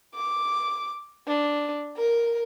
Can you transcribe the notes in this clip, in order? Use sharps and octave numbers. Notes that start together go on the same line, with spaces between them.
D6
D4
A#4